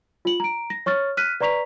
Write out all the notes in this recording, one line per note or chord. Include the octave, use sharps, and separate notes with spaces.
F4 F#7
A#5 D7
A#6
C#5 C#6 F6 A6
F6 F#6 B6 D#7
B4 D5 A#5 C#6 B6 F7